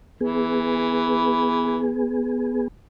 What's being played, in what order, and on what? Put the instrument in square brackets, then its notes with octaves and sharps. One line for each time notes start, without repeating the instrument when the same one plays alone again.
[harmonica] E3 [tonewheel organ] B3 G#4